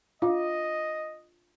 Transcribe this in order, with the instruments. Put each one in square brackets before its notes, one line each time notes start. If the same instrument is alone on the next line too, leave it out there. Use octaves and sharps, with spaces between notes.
[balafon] D4 F4 F5 [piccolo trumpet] D#5